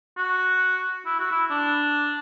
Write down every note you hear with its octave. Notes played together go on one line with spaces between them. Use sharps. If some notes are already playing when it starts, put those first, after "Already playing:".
F#4
E4
F#4
E4
D4